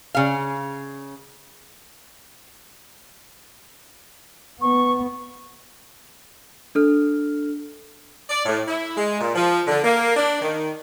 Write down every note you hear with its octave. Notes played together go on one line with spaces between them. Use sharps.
C#3 F5
B3 C#6
D4 A4 F6
D5
A2
E4
G#3
A#2
F3
D3
A#3
D4
D#3